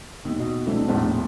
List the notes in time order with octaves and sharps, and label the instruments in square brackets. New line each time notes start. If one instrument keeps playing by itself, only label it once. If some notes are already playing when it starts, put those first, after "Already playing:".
[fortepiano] D#2
[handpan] B2 F#4 D#5
[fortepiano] E3 [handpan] A3 C4 D4
[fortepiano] A#1 E2 A2 [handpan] C#4 C5